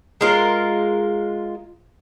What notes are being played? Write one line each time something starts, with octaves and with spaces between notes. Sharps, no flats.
G#3 F4 A#4